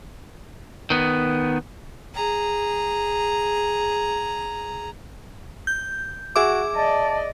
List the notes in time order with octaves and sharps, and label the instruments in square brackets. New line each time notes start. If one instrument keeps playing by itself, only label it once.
[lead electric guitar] D#3 B3
[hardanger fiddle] G#4 A#5
[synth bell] G6
[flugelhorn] F#4 [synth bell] G#4 E5 D6
[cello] D5 D#5 [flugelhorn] A5